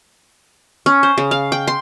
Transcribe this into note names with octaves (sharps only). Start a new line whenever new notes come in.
C#4
C5
C#3
F5
G5
C6